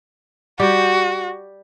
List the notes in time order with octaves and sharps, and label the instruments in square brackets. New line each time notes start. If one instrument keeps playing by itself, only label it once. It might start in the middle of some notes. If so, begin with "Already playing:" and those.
[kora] G3 G4 [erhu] F#4